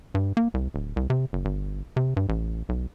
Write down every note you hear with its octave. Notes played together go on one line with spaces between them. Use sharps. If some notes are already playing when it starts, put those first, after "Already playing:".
G2
A#3
C2
D1
C2
C3
F#1
G1
C3
G2
A1
B1